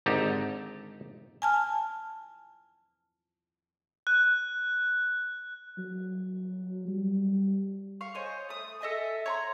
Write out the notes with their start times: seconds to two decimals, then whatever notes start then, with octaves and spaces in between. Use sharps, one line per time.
0.06 G#1 D3 D#4 G4 A5
1.42 G#5 A5 F6
4.07 F#6
5.78 F#3
6.88 G3
8.01 F5 C#6
8.15 C5 C#5 D#5 G#5
8.49 A3 D#6
8.81 A4 D#5 E5 G#5
9.26 C#5 A#5 C6